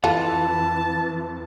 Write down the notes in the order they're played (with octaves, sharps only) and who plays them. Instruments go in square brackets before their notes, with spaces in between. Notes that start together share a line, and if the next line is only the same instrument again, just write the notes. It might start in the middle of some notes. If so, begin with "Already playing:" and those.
[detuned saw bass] F2 [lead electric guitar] E3 [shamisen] F4 A4 [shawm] A5